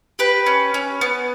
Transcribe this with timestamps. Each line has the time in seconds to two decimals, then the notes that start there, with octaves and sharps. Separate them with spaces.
0.19 G4 B4
0.46 C#4
0.74 C#4
1.01 B3